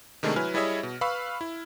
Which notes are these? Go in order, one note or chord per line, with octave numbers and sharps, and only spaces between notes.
C3 D#3 G#3 A3 D4 G#4
F#3 E4 B4 G#5 F6
G3 E4 G#4 C#5 D#5 E5
B2
B4 F5 B5 C#6 E6 F6
E4